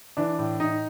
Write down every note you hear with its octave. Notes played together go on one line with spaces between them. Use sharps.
E3 D4
A2
A2 D#4